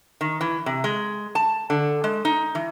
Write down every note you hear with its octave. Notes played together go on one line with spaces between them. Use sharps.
D#3
E3
C3
G#3
A5
D3
G#3
D#4
E3